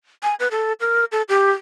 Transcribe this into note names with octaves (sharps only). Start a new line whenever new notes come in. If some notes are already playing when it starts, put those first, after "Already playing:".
G#5
B4
A4
A#4
A4
G4